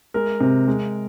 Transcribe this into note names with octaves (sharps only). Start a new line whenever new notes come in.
G#3 A#4
C3
G#3